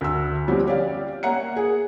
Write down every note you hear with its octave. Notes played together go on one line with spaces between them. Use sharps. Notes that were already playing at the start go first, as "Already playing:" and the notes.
D2 E6
F3 G3 C4 C#4 F#4 G4
C#4 G4 C#5 D5 F5
A#3 C#5 F#5 A#5 C#7
G#4